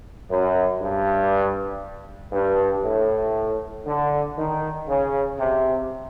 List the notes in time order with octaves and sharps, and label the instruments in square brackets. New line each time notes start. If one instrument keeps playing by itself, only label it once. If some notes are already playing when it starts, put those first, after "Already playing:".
[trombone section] F#2
G2
G2
A2
D3
D#3
C#3
C3